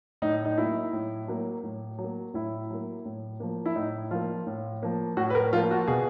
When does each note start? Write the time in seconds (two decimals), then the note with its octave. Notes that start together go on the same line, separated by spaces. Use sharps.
0.22 A2 D#4
0.45 D#4
0.57 F#3 A#3 E4
0.93 A2
1.28 F#3 A#3
1.64 A2
1.99 F#3
2.04 A#3
2.34 A2 E4
2.70 F#3 A#3
3.05 A2
3.40 F3 A#3
3.66 E4
3.75 A2 D#4
4.11 F3 A#3 F4
4.47 A2
4.83 F3 A#3
5.17 A2 F#4
5.30 B4
5.35 A#4
5.52 F3 F4
5.57 A#3
5.71 F#4
5.87 B2 G#4